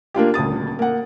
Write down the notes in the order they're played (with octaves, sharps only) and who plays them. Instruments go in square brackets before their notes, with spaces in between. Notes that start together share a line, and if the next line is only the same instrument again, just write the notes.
[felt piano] A#3 D4 F4 G4
D#1 D2 D#6 A6
A#3 F#5